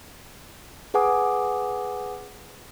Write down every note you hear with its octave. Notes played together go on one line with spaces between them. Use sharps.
G#4 B4 F#5 G#5 D6 D#6